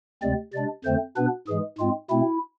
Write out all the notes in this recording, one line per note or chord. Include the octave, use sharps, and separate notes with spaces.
D2 C3 G#3 C4 D5
C3 G#3 D4 D5
F2 D3 A3 C4 C5
B2 B3 D4 B4
G#2 E3 G#3 G#4
G#2 G#3 C4 F4
B2 A3 C4 E4